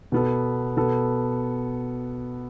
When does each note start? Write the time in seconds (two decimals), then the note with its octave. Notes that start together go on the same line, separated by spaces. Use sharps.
0.12 B2 B3 A4
0.77 B2 B3 A4